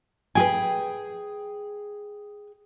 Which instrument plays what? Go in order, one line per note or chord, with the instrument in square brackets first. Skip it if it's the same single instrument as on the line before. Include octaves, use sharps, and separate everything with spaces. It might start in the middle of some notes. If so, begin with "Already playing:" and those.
[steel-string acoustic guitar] G#4 G5 [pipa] B4 G#5